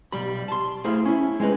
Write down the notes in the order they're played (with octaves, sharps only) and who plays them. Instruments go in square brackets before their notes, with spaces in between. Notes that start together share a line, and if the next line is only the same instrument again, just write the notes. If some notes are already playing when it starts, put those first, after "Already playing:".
[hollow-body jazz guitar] B1 G3 B5
A5 C6
A3 E4 G#4 C5 F5 B5
C#4 E4
G#3 C4 D#4 B4